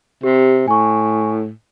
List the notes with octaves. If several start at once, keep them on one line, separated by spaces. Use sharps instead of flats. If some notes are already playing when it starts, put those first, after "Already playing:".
C3 G4
A2 G#5 C#6